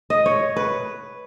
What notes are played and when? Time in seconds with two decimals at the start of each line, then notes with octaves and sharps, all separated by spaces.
0.10 D#5
0.26 C#5
0.56 B4